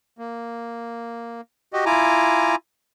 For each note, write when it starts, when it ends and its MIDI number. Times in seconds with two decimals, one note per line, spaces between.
0.18 1.41 58
1.73 1.85 66
1.73 1.85 67
1.73 1.85 75
1.86 2.55 64
1.86 2.55 65
1.86 2.55 80
1.86 2.55 82
1.86 2.55 86